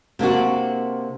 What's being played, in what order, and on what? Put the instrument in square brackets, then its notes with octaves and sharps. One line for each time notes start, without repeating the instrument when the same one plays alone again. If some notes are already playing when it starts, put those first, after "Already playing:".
[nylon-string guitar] C3 A#3 D4 F#4